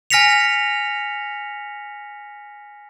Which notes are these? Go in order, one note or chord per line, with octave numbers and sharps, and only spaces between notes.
G#5 F6 A#6 B6 C#7 F7